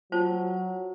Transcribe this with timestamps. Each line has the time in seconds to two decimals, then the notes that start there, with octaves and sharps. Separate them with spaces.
0.12 F#3 F4 C5 A5